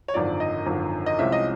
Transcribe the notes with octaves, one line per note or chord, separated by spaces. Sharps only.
C#5
G#1 F#2 D3 F3 D5
D#5
G#1 F#2 D3 F3
D#5
C2 C3 F3 G#3 C#4 E5
D#5